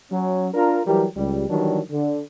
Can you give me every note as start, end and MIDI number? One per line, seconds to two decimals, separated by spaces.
0.12 0.48 54
0.12 0.48 61
0.54 0.81 62
0.54 0.81 65
0.54 0.81 70
0.87 1.06 52
0.87 1.06 54
0.87 1.06 55
0.87 1.06 67
0.87 1.06 70
1.17 1.49 37
1.17 1.49 55
1.50 1.80 51
1.50 1.80 52
1.50 1.80 54
1.50 1.80 55
1.50 1.80 62
1.91 2.23 50